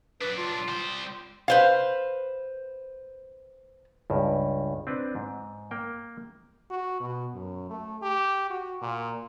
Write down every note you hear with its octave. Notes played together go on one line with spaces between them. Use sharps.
F#3 D4 B4
F4
G3 C5
B4 C5 F5
C#2 G2
C4 D4 B4
G#2
A#3 G5
F#4
B2
F#2
A3
G4
F#4
A#2